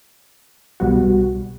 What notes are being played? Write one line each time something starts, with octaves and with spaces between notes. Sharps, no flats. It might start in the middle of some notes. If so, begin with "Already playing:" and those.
C2 B2 G3 B3 F#4